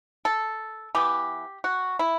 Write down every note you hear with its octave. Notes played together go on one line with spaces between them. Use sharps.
A4
E3 B3 G4
F#4
E4